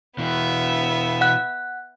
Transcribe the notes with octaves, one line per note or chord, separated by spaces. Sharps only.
B2 E3 B3 E5
F#5 F#6